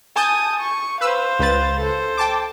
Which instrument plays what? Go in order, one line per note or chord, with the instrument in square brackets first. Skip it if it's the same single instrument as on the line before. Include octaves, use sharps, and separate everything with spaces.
[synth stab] G#5 A5 G6 [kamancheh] D#6
[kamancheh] C#6
[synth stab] B4 E6 [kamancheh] C5 F5
[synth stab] C#2 B4 A6
[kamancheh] A4 C5
[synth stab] G5 A5 D6